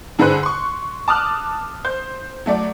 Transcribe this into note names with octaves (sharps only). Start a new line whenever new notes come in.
G2 D3 G#4 B4 C5 F#6
C6 C#6
A5 D6 D#6 F6 F#6
C5 G6
F#3 A3 D5